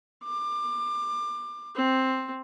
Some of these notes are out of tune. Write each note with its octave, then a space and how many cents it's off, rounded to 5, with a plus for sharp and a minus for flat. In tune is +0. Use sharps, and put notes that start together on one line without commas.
D6 +25
C4 +5